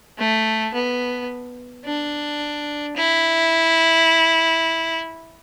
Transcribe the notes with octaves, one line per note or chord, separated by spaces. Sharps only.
A3
B3
D4
E4